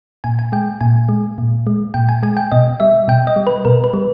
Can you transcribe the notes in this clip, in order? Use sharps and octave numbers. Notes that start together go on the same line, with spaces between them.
A#2 G#5
G#5
G#3 G5
A#2 G#5
G#3
A#2
G#3
A#2 G5
G#5
G#3 G#5
G5
B2 D#5
G3 E5
B2 G5
D#5
G3
B4
B2 A#4
B4
G3